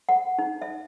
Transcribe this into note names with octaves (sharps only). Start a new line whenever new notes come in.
F#5
D#4
E5